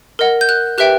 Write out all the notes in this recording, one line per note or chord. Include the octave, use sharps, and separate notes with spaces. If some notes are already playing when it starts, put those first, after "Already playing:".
A#4 D#5 F#5
G6
F#6
G4 B4 E5 G5 F#6